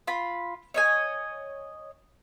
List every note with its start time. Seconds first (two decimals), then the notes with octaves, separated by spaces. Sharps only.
0.07 F4 B5
0.74 C#5 D#5 G#5